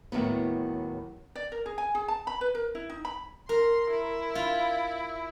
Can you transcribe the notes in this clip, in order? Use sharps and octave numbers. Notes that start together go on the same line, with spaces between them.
D#2 A2 F#3 B3
D5
A#4
G#4
G#5
G#4
A5
B5
B4
A#4
E4
D#4
B5
A#4 C6
E4
F4